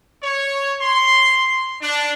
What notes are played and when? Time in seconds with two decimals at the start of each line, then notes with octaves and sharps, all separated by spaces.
0.23 C#5
0.81 C6
1.82 D4